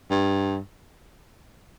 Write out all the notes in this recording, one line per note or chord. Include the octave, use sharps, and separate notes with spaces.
G2